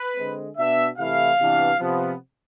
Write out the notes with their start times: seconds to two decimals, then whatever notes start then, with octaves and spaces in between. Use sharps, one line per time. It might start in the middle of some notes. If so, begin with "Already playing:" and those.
Already playing: B4
0.16 D3 G#3 C4
0.57 B2 B3 D4 E5
0.98 C3 E3 A3 E4 F5
1.39 C3 E3 B3 D4
1.79 C3 F3 B3